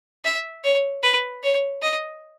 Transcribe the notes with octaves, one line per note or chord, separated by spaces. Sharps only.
E5
C#5
B4
C#5
D#5